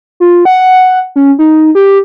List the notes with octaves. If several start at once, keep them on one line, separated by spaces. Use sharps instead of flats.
F4
F#5
C#4
D#4
G4